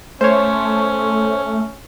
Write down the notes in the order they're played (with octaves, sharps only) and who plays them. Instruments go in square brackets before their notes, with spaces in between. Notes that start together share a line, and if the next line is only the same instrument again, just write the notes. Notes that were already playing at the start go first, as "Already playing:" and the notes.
[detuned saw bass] A3 [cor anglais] C#4 [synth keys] C5 C#5